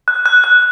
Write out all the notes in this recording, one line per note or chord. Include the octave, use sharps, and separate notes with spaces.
F#6
F#6
F#6